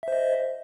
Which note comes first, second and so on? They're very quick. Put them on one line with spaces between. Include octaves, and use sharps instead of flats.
E5 C5 D#5